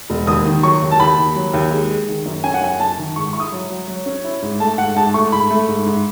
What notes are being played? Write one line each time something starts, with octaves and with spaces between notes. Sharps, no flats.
E1
D#2 D#6
D#3
F#3 C#6
D#2
A5
D#2 B5
D#2
F#3
D#2
G#3
G#3
D#3
F#2
C#4 G#5
F#5
F#2 G#5
F#2 A5
D#3
G#2 C#6
E4 C#6
D#6
F#3
F#3
F#3
C#4
E4
G#2
A3 A5
G#2 F#5
G#2 A5
A3 C#6
G#2 B5
A3
G#2
G#2